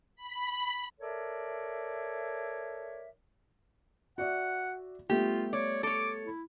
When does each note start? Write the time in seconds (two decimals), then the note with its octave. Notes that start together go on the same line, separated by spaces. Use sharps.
0.16 B5
1.00 A4 A#4 C#5 D5 E5
4.18 F#4 D5 E5 F#5
5.09 G3 A3 B3 F4 G4
5.53 C#5 D5
5.83 A4 C#5 D6
6.25 E4